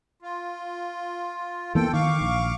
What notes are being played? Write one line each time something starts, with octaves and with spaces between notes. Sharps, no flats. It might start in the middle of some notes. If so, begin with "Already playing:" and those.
F4
E3 A#3 B3 A4 G5
D#3 F5 C#6 D6
A#1